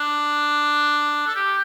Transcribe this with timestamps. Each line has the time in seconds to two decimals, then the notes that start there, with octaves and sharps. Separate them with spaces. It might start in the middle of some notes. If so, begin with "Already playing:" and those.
Already playing: D4
1.27 A4
1.35 G4